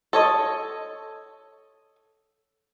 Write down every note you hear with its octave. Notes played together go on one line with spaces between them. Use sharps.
A4 C#5 D#5